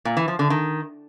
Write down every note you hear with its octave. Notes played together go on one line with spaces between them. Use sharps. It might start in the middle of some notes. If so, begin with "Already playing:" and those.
A#2
E3
F3
D3
D#3